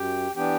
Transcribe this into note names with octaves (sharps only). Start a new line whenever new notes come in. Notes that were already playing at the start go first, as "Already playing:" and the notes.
Already playing: F#2 G4 G5
E3 B3 D4 G4 G5